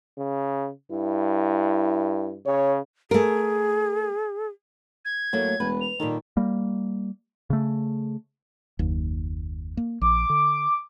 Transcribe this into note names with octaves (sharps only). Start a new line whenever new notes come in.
C#3
G2 E4
C#3 C#5
A3 G#4 A#4
G#6
A2 F#3 A3 A#3
E1 B4
F7
A#2 D#3 G3 A4
G3 A#3
C#3 A3
F#1 D#2
A#3
A#1 D6
D3